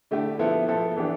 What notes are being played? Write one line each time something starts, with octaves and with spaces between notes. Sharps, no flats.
D3 A3 E4 G4
F3 B3 E4 A4
F3 B3 E4 A4
E3 B3 D4 G4